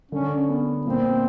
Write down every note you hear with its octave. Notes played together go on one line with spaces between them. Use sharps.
D3 C#4
B3
A#2 C4